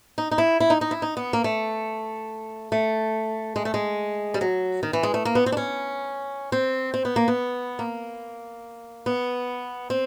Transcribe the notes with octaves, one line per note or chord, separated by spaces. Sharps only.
D#4
D#4
E4
E4
D#4
D#4
E4
D#4
B3
A#3
A3
A3
G#3
A3
G#3
G3
F#3
D#3
E3
G#3
A3
A#3
B3
C4
D4
C#4
C4
C4
B3
A#3
B3
A#3
B3
C4